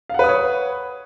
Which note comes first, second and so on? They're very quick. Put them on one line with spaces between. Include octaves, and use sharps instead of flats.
F5 F#5 B4 D#6 C#5